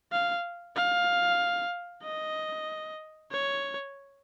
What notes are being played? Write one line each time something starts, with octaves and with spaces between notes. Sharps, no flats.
F5
F5
D#5
C#5